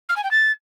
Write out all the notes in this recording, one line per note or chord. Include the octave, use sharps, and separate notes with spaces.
F6
G#5
G5
A6